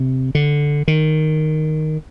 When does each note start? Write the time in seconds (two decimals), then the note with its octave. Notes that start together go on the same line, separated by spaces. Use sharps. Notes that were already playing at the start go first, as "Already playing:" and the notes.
Already playing: C3
0.35 D3
0.88 D#3